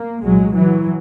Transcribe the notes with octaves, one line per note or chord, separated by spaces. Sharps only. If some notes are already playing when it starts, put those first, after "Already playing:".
Already playing: A#3
C2 A#2 F#3 G#3
E3 F#3